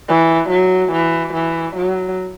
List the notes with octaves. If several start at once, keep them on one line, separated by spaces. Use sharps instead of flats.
E3
F#3
E3
E3
F#3